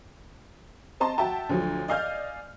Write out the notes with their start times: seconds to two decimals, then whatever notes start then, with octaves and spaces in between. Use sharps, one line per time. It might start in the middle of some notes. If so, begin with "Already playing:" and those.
1.00 C4 D#5 A5 C6
1.18 F#4 E5 G5 A5
1.49 D2 F3 F#3
1.88 D5 D#5 F5 G#5 F6 G6